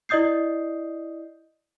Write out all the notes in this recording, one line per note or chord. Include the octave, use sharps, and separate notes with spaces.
E4 D5 D#5 D#6 G6 C7